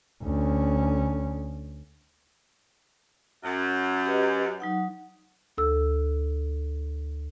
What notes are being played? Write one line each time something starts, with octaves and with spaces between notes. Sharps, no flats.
D2 C#4
F#2
G4 B4 D#5
F#3 D#4 F#5
D2 A4 E6